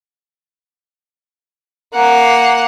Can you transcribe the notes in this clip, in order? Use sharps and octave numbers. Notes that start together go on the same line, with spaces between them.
A#3 F#5